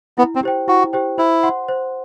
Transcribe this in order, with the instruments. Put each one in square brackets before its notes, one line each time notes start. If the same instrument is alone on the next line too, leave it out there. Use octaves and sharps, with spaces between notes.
[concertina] B3 [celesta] E4
[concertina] C4
[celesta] G4 C5 G5
[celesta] E4 [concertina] F#4
[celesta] G4 C5 G5
[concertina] E4 [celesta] C5
[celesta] F#5 C6
C5